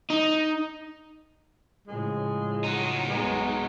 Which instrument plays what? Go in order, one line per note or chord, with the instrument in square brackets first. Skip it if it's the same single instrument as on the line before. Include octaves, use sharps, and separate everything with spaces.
[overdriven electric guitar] D#4
[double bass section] A2 C#3 F3 [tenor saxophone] G#3
[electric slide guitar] F#3 D#4
[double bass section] B1 F#2 B3 [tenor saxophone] G#3